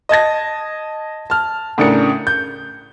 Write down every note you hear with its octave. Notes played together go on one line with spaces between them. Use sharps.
D#5 A5 G#6 A#6
A5 F6
A2 C#3 D4 A#4 C#7
G6